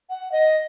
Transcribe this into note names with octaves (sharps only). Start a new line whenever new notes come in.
F#5
D#5